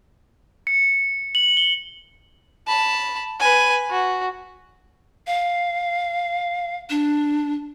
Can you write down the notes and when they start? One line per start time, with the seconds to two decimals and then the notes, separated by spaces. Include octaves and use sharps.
0.67 C#7
1.35 F#7
1.57 G7
2.67 A5 B5
3.40 B4 G#5
3.91 F#4
5.27 F5
6.90 D4